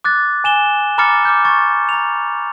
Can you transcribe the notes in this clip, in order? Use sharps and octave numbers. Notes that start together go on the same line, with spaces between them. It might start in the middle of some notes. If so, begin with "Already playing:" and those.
D6 F#6 A6
G#5 E7 G7
A#5 B5 D6 F6 A6 C#7
D6 F6 G6
C#6 A6
A#5 F7